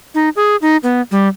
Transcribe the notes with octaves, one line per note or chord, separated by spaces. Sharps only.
D#4
G#4
D#4
B3
G3